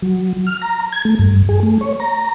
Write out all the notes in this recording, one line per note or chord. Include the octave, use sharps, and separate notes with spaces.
F#3
F6
A#5
G#6
A3
G2
G#4
A3
C#5
A#5